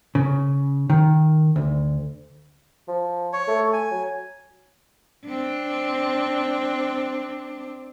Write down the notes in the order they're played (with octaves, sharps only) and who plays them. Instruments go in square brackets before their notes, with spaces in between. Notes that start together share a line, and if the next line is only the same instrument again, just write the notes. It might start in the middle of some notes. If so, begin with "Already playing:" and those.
[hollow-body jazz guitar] C#3
D#3
D2
[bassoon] F3
[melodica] C#5
[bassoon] A3
[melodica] G#5
[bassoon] F#3
[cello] C4 D4